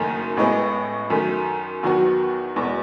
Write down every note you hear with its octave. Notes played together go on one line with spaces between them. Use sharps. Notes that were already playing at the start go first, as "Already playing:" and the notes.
Already playing: F#1 F#2 D#3 A3
A1 A2 G#3 B3
F#2 D#3 A3
E2 D#3 F#3 B3 F#4
E2 B2 G#3